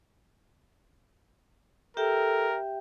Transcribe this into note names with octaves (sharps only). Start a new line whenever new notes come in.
G4 A4 A#4 E5 G5